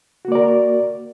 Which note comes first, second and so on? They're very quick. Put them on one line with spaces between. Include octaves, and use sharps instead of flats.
F#4 A#3 D5 A#4